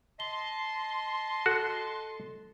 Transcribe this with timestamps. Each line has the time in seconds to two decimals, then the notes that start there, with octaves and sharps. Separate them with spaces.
0.20 D#5 A5 C6 G7
1.46 F#4 A4